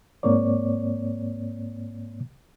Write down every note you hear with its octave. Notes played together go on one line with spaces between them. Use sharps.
G#2 A#3 C4 C#5 D5